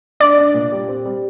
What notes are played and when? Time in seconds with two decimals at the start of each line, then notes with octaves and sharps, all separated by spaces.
0.20 D4 D5
0.38 D4
0.54 A#2
0.72 G3
0.88 C4
1.05 G3